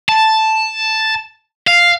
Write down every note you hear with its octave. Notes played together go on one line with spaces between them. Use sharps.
A5
F5